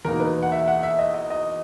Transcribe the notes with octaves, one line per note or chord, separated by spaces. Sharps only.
E2 B2 A#3 D#4 A#4
B4
F#5
E5
F#5
E5
D#5
D#5
D#5